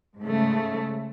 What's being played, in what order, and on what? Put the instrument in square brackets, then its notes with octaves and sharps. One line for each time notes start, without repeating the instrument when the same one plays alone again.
[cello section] G#2 C#3 A3